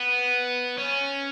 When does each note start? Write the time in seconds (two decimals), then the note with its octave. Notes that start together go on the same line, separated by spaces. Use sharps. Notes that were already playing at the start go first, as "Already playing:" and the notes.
Already playing: B3
0.78 C#4